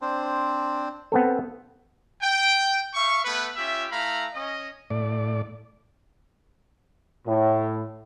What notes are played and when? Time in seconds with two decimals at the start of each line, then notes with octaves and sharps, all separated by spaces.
0.02 C4 D4 C5
1.12 B3 C4 A4
2.22 G5
2.95 E5 F5 C#6
3.24 A3 B3 B4
3.56 C#4 F4 G4 E5
3.91 A3 E4 F5 A#5 B5
4.34 C#4 D#5
4.90 A2 D5
7.27 A2